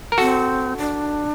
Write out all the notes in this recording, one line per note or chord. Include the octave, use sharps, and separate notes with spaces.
A#4
C4 F#4 A4
D4